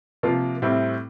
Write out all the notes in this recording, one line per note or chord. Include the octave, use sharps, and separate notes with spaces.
C3 F3 A#3 F4
A2 G3 C4 E4